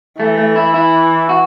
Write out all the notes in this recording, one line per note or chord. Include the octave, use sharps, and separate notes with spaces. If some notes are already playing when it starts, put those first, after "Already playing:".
E3 A3
A3
E4
E4
F#4